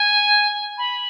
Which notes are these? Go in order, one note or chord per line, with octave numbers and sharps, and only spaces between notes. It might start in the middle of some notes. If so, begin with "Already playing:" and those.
Already playing: G#5
B5